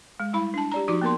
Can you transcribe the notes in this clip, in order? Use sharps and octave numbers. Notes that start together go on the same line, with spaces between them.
G#3
G3 E4 B5
D4 A5
G4 D5 A#5
F3 D#4 F#4 D5 D6
A#3 B3 A#4 C6